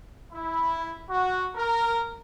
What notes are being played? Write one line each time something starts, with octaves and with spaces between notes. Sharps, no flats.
E4
F#4
A#4